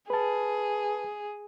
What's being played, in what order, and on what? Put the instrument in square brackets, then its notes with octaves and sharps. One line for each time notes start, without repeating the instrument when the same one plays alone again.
[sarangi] G#4 [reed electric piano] B4 A5